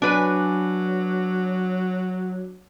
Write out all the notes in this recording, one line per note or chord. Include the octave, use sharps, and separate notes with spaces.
F#3 D4 B4 G#5